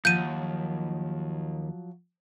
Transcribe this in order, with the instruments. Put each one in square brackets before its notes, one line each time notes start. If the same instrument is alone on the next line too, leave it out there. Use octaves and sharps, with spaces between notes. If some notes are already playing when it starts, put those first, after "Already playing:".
[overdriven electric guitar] D#2 [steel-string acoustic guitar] F3 F#3 [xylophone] G6 D#7